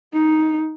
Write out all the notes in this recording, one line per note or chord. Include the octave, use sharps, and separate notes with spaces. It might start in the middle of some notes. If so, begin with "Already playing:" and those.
D#4